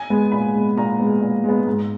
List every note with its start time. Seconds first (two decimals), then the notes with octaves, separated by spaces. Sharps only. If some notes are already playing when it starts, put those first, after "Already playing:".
Already playing: G#5
0.10 G#3 B3
0.32 A#2 B5
0.54 G#3 B3
0.77 A#2 A#5
1.00 G#3 B3
1.21 A#2
1.44 G#3 B3
1.67 G#2